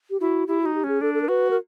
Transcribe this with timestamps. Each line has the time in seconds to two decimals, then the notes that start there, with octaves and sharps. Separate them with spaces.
0.10 G4
0.20 E4 F#4
0.47 E4 G4
0.61 D#4 F#4
0.75 G4
0.84 C#4 G#4
1.01 D4 A4
1.14 A4
1.22 A#4
1.28 F#4 B4
1.50 A#4